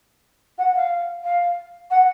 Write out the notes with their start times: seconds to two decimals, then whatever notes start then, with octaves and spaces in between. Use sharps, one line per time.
0.58 F#5
0.75 F5
1.24 F5
1.90 F#5